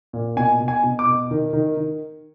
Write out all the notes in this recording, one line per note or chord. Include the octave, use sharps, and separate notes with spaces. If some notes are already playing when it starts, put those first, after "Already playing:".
A#2
B2 G#5
B2
G#5
B2
D6
B2
D#3
D#3
D#3